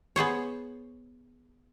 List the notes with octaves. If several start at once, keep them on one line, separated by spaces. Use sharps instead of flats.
B3 G#4 C5 C#5